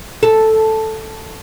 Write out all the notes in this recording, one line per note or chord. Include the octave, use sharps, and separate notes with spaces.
A4